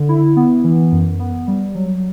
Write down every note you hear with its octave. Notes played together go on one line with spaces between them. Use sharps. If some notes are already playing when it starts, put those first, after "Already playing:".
Already playing: D3
E4
B3
E3
F#2
B3
G3
F#3